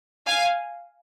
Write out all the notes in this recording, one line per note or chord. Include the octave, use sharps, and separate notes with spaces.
F5 G#5